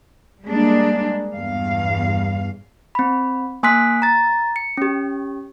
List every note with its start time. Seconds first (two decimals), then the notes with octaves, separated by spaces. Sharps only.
0.44 G3 G#3 A#3 D4
1.35 E2 G2 F5
2.95 C4 B5
3.63 A#3 G#5 C6 D#6 F#6 B6
4.02 A#5 A6
4.56 C#7
4.77 C#4 G4